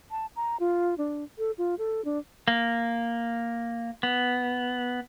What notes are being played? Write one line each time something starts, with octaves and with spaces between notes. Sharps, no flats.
A5
A#5
F4
D4
A4
F4
A4
D4
A#3
B3